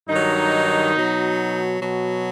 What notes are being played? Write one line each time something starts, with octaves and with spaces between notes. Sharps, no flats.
G2 D#3 F#3 D#4
B2 F#3
B2 F#3